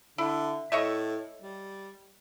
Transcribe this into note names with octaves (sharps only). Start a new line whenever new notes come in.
D3 E4
A2 C#5 D#5 E5
G3